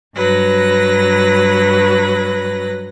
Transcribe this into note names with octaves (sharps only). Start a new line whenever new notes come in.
G2 F#3 B4 A#6